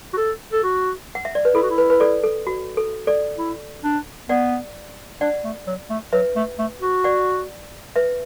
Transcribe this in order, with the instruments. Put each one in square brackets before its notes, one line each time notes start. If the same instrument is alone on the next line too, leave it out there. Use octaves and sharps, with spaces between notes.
[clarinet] F#4
A4
A4
F#4
[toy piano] F#5
E5
D5
B4
[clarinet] E4 [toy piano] A4
[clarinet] F#4
E4
[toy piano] B4
B4
A4 D5
A4
F#4
A4
A4 D5
[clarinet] E4
D4
[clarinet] B3 [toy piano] D5 F#5
[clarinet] D4 [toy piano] D5 F#5
[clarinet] A3
F#3
A3
[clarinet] F#3 [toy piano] B4 E5
[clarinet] A3
A3
F#4
[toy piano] D5 F#5
B4 E5